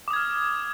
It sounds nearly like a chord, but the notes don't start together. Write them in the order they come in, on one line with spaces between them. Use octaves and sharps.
D6 D#6 G#6 F6